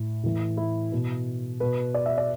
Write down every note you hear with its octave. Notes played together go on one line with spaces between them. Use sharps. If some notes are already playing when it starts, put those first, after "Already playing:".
Already playing: A2
A2 E3
E4
B2
B2 B4
D5
E5
D5